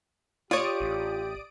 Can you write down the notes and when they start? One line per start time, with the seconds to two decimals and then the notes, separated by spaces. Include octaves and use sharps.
0.51 F4 G4 C#5 D5 D#6 D7
0.80 A1